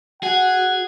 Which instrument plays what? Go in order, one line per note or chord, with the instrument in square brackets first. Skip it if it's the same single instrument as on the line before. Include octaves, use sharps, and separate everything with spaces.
[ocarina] F#4 [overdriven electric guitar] G#4 [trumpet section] F#5